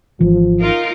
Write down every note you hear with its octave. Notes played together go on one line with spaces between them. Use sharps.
G#1 E3 F3
D#4 F4 A#4